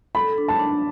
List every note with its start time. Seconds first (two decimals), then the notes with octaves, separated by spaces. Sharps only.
0.15 A4 B5
0.38 D4
0.48 A5
0.60 D4